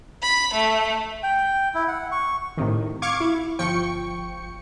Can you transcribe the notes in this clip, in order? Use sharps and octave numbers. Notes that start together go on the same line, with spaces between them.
B5
A3
G5
E4
F#5
C#6
A2 C3 D#3
F5 C#6 D6 G#6
E4
G1 F3 G5 C#6 C#7